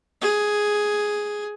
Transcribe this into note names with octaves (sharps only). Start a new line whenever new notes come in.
G#4